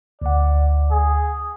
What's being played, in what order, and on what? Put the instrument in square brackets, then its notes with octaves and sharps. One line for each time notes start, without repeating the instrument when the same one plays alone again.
[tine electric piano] D2 F#5 [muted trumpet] D5
[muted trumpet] G#4